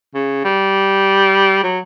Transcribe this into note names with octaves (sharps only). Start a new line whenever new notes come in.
C#3
G3
F#3